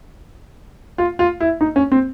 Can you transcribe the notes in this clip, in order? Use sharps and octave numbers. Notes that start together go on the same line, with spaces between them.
F4
F4
E4
D#4
C#4
C4